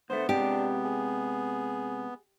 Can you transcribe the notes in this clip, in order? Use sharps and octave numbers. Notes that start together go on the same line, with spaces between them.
D2 A3 B3 C5
C3 G#3 D4 G4
G#4